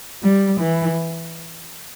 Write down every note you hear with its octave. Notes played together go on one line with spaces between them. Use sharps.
G3
E3